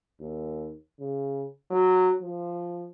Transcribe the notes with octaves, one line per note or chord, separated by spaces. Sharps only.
D#2
C#3
F#3
F3